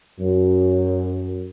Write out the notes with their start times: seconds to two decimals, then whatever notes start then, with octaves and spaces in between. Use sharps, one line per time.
0.20 F#2